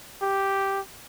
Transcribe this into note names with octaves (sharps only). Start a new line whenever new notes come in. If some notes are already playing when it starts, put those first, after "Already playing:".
G4